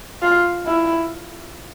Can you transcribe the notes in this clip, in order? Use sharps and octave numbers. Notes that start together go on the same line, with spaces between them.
F4
E4